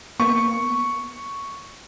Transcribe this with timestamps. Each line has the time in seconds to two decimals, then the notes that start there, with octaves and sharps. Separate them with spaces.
0.20 A#3 B3 C#6